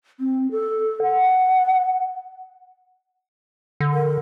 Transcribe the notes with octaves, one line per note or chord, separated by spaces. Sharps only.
C4
A4
F#5
D3
A#4